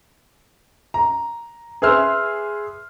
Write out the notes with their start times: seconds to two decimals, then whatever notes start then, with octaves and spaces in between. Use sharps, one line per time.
0.94 A#5
1.82 G#4 B4 E5 C6 E6 F6